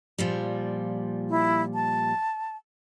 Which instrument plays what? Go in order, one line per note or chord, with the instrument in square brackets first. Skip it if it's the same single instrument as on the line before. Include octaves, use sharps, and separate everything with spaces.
[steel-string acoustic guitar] A#2 F3 G3
[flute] E4
A5